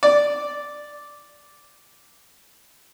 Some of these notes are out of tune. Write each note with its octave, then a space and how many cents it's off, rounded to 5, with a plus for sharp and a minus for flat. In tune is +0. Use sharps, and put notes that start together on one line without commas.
D5 -5